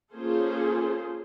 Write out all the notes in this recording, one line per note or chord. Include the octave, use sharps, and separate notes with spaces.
A#3 C#4 F4 G#4 A4 C5